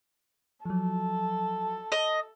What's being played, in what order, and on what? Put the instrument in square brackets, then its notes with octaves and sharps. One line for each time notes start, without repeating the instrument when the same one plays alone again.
[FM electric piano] F3 F#3 [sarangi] A4
[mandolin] D#5